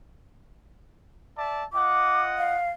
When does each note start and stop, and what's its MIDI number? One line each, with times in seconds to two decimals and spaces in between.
1.37 1.64 74
1.37 1.64 76
1.37 1.64 81
1.73 2.57 65
1.73 2.57 75
1.73 2.57 78
1.73 2.22 86
2.38 2.70 77